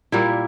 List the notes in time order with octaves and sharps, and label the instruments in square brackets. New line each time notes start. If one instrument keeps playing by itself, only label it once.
[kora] A#2 G3 A#3 E4